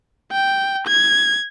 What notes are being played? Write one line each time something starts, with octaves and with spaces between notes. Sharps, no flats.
G5
G#6